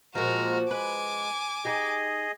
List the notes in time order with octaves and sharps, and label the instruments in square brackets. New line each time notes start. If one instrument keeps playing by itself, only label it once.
[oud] A#2 F3 [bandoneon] G#3 A#5 F6 [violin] F#4
[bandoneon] G#3 [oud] B4 [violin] G#5 D6
[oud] D#4 G4 [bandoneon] G#4 D#5